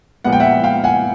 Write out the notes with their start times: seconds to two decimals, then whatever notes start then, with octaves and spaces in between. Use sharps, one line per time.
0.25 A#2 F3 G#3 B3 F#5
0.33 G5
0.40 E5 F#5
0.63 F5 G5
0.84 F#5 G#5